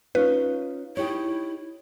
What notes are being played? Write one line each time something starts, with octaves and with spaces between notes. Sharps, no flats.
C#4 D#4 F4 B4
D#4 E4 G4 C#5